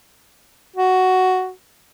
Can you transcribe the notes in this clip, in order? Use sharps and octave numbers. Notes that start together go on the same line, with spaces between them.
F#4